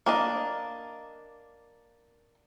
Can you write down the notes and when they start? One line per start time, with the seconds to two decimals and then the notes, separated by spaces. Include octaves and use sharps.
0.06 A#3 D4 D#5